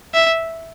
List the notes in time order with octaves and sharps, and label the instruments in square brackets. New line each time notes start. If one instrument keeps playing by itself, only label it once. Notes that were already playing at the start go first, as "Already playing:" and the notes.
[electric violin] E5